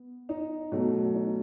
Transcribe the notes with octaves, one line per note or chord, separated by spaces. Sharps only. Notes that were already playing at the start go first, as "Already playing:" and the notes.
Already playing: B3
D#4
B2 F#3 A3
D#4